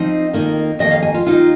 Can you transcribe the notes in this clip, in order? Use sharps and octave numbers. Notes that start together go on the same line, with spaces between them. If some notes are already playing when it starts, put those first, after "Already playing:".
Already playing: F3 C4 D#4 D#5
F2 D#3 A#3 D#4
F2 D#3 A#3 D#4 D#5
F5
G#5
F4
D#2 D#3 A#3 D#4 F4